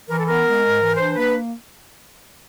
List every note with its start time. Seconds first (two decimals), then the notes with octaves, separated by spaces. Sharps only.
0.09 E3 A#4
0.19 A4
0.27 B3 A#4
0.45 G#3
0.63 G#2
0.81 E3
0.97 D4 C5
1.16 A#3 B4